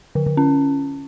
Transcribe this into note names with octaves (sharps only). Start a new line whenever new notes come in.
D3
D3
C#4